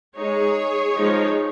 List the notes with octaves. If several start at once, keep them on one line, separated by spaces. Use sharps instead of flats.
G#3 D#4 G#4 C#5
F3 G#3 D#4